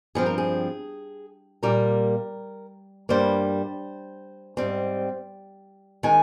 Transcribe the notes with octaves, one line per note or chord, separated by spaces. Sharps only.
G2 F3 C4 G#4
A#4
G#4
A#2 G3 A#3 A#4
G2 G3 A#3 C5
G#2 G3 C4
D#3 G#3 G#5